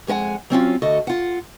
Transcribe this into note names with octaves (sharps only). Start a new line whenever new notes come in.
F2 G#3 A#4 F#5 G#5
F#3 C4 C#4 F4
D2 F#4 A4 D#5
F4 F#5